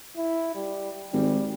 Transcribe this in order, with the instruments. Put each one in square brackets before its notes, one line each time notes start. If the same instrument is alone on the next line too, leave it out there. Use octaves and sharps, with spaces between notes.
[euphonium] E4
G3
[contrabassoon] G#1 [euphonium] G3